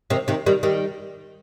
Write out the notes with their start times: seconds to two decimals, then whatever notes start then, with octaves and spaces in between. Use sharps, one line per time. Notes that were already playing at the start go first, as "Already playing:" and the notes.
0.10 C3 D#3
0.28 C3 D#3
0.46 D#3 G3
0.63 D#3 G3